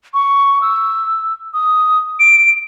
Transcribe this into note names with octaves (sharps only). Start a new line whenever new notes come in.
C#6
E6
D#6
D7